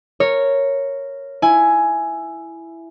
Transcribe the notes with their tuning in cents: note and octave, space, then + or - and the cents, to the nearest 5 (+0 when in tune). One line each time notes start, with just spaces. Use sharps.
A#4 -10 C#5 -5
E4 +10 G#5 +10